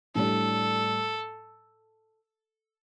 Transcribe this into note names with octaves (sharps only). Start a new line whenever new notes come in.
A2 G3 D4 A4